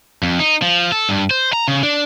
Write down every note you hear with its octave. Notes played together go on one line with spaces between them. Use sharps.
F2
D#4
F3
A4
G2
C5
A#5
C#3
D4